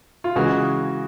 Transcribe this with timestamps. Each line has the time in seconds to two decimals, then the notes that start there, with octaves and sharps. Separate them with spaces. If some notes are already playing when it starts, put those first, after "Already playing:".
0.24 F4
0.35 C#3 E3 G#3 F#4